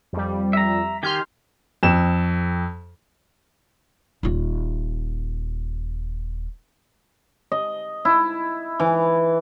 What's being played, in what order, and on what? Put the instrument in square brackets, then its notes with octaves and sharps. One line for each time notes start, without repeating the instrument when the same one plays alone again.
[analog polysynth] F2 G3
[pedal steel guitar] E5 A#5
[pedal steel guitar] D#3 G4 G#5 [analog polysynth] C6 F6 G6
[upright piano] F2 E7
[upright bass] D#1 F4
[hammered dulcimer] D#5
E4
E3